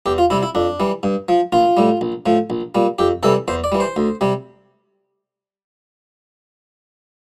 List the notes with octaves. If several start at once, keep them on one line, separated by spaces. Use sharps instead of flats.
E2 G4
F4
C3 G3 E4
E4
F2 D4
E3 G3
G2
F3
A#1 F4
A2 G3
A#1
A2 F3
A#1
A#2 G3
F2 G4
C3 E3 G3 A4
E2 C5
D5
E3 G3
C5
D2
C3 G3